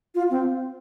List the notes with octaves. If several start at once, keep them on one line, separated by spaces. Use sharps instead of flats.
F4
C4